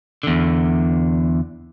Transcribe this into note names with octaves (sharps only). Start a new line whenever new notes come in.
E2 D3